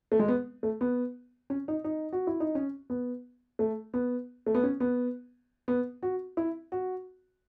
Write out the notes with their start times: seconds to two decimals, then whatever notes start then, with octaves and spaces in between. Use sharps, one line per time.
0.12 A3
0.19 G#3
0.28 B3
0.63 A3
0.81 B3
1.50 C#4
1.68 D#4
1.84 D#4
2.13 F#4
2.27 E4
2.40 D#4
2.55 C#4
2.90 B3
3.59 A3
3.94 B3
4.46 A3
4.55 B3
4.63 C#4
4.80 B3
5.68 B3
6.03 F#4
6.37 E4
6.72 F#4